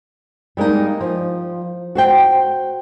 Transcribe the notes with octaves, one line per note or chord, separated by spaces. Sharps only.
G3 G#3 A#3 D#4
F3
F#4 C5 G5